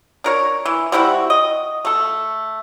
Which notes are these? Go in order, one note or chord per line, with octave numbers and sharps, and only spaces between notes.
D4 A#4 C#5
E3
G3 C4 E4 F#4
D#5
A3 A4